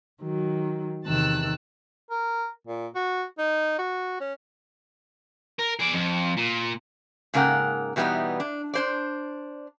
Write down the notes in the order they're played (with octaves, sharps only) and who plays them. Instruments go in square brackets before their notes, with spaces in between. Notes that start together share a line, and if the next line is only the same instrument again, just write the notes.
[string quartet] D#3 F#3
E2 C3 D#3 A5 E6 F#6
[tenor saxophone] A#4
A#2
F#4
D#4
F#4
C#4
[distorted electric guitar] A#4
G#4 D5
F2
A#2
[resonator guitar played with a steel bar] G#2 C#3 A#3 A#4 F#5 G5
B2 E3 G3 A#3 B3 D#4
D4
D4 C5 D5